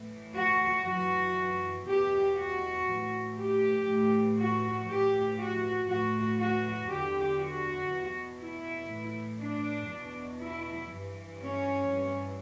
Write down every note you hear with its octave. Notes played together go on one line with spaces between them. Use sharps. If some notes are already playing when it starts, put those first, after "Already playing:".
Already playing: A2 E3
F#4
F#2 E3 F#4
E2 B2 G4
F#4
A2 E3
G4
A2 E3
F#4
A2 E3 G4
F#4
A2 E3 F#4
F#4
E2 D3 G4
F#4
E2 B2
E4
A2 E3
D4
E2 B2
E4
G2 E3
C#4
G2 E3